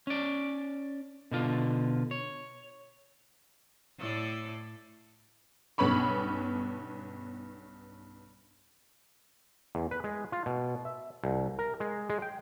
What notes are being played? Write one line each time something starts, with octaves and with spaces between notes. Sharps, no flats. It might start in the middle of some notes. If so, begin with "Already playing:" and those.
C#4 D5
B2 D3 F4
C#5
A2 A4 D5
B1 G2 B3 C#4 B5 C#6
E2
B4
G#3
F4
B2
E5
C2
A#4
G#3
G#3
G5